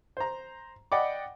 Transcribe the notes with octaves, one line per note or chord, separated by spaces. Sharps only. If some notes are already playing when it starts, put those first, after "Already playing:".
C5 A#5
D5 D#5 F#5 G5 B5 D6